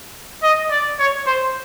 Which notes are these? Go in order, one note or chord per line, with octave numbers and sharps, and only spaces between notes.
D#5
D5
C#5
C5